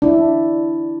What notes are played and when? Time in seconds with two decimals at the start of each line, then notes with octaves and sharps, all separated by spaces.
0.02 D4 E4